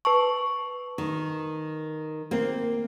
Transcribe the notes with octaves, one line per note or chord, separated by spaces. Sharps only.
B4 A5 C#6
D#3
A#3 C4